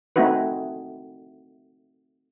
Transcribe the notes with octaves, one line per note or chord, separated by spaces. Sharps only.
A3 C4 D#4 E4 F#4 B4